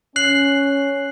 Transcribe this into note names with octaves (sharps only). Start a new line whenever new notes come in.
C#4 F#6 C7 F#7